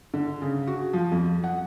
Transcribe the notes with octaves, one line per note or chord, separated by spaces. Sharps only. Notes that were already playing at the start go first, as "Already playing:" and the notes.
D3
C#3
F#4
F3
F2
F#5